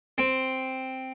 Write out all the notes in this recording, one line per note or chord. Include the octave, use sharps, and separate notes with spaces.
C4